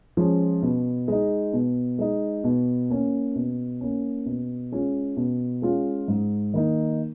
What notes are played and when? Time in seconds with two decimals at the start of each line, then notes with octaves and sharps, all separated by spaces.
0.17 F3 G#3 C#4
0.62 B2
1.08 G#3 D#4
1.53 B2
1.99 G#3 D#4
2.44 B2
2.90 A#3 C#4
3.35 B2
3.81 A#3 C#4
4.26 B2
4.72 G#3 C#4 F4
5.17 B2
5.62 G#3 C#4 F4
6.08 G#2
6.54 D#3 A#3 D#4